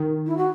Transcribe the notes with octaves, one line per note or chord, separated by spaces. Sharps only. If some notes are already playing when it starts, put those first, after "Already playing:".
Already playing: D#3
E4
F#4